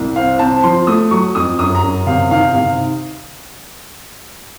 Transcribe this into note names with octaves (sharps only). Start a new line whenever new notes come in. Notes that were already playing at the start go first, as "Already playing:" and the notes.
Already playing: C2
C4 F5
C4 A5
F3 C6
A3 D#6
F#3 C#6
F2 D#6
F#2 D#6
A#5
F#2
C3 F5
D#3 F5
C3 F5